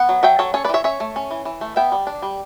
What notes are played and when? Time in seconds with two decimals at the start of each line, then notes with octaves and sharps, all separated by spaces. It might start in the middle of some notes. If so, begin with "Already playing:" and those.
Already playing: B3 F#5
0.09 F#3
0.23 F#3 E5 G5
0.39 F#3 A4 C#5
0.54 C#4 A4 C#5
0.64 B4 D5
0.69 E3 C#5 E5
0.84 C#4 C#5 E5
1.00 A3
1.16 C#4
1.31 E3
1.45 E3
1.61 A3
1.76 B3 E5 G5
1.92 G3
2.07 D4
2.22 G3